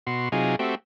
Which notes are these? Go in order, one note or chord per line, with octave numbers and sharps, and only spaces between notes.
B2 F#4 C6
C3 F#3 D#4 F4 G#4
A3 C4 F#4 G4 E5